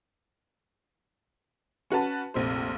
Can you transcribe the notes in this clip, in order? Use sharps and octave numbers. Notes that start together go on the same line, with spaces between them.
C#4 F#4 B4 A5
F1 A#1 C3 C5